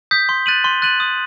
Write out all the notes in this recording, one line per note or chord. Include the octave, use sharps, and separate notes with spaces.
D#6 G6 B6
C6
F#6 A6 D#7 F#7
C6
F#6 A6 D#7 F#7
D#6